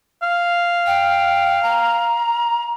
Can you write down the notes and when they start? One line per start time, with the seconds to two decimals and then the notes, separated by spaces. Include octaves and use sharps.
0.23 F5
0.86 G5
1.63 A#5